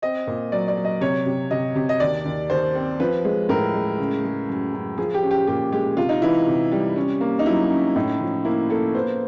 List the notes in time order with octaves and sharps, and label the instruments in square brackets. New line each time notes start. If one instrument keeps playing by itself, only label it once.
[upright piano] C4 D#5
A#2
F#3 D5
D5
F#3
D#5
C3 C#5
C3
C3 D#5
C3
D#5
D#2 D5
D#2
D#2 C5
C4
F3 B4
G#3
A2 A#4
G#3
C#3
G#3
F#2
F#2
F3 G#4
G4
C#4
G4
A#2 G4
G#3 G4
C3 F4
D#4
E3 E4
C3
G3
C#4
A#3
D#4
F#3 E4
C#4
A2 D#4
F3
A#3 E4
A#3 A4
B3 C5